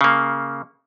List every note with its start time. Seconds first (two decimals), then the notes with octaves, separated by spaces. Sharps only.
0.01 C#3 A#3